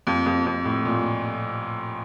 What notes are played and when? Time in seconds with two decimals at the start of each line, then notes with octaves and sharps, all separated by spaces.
0.07 F2
0.26 F2
0.46 F2
0.65 A2
0.85 A#2